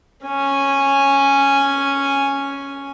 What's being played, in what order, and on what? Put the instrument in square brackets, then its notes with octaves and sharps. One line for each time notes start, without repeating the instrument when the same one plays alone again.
[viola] C#4 G#5